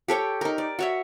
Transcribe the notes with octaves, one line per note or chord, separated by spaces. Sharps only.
G4 A4 C#5 G5
D#4 A#4
D5
F#4 C#5 E5